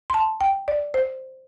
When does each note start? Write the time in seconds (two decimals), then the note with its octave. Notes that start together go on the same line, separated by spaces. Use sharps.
0.10 C6
0.14 A5
0.41 G5
0.68 D5
0.94 C5